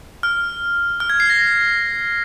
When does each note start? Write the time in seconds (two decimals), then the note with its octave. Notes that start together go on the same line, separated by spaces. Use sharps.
0.23 F6
1.00 F6
1.10 G#6
1.20 C7
1.30 A#6